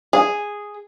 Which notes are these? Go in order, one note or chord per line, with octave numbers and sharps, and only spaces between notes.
G#4